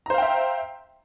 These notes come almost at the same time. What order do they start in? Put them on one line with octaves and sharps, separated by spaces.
A#5 C5 F5 G5 E5